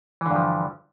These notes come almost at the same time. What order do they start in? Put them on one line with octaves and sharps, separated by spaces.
E3 D3 G2 F3